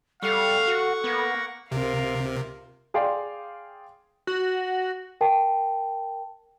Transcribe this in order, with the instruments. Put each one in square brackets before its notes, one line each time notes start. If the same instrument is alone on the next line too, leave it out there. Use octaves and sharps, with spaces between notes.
[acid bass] G3 [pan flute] A4 [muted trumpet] F5 [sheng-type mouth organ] F#5 C#6
[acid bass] F#4
[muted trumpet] A#3 [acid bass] B3
[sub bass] C#2 [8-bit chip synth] C3 [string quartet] F4 A#4 F5
[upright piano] G#4 D5 F5 G5 C6
[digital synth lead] F#4
[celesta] A#4 G5 A5